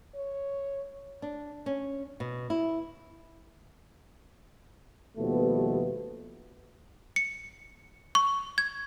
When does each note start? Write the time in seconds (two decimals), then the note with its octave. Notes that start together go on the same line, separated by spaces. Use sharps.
0.15 C#5
1.22 D4
1.66 C#4
2.20 B2
2.50 E4
5.18 D#2 B2 F3 G3 A3 B3
7.16 C#7
8.15 C#6
8.58 G#6